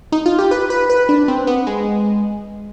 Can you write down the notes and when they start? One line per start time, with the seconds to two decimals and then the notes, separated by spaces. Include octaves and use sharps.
0.12 D#4
0.26 F4
0.39 G4
0.51 B4
0.70 B4
0.90 B4
1.09 D4
1.28 C4
1.47 B3
1.67 G#3